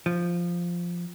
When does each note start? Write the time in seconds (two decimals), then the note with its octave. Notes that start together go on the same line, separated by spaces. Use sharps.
0.06 F3